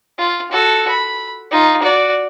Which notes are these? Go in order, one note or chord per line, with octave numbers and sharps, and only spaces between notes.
F4
F#4 A4
B5
D#4 F4
F#4 D5